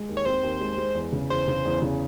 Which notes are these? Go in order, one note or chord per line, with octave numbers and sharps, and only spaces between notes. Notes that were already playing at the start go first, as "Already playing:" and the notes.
Already playing: G#3
D#2
C#5
C4 C5
D#2
G#3
G#3
E2
C#3
E2 C5
C#3
E2
C#3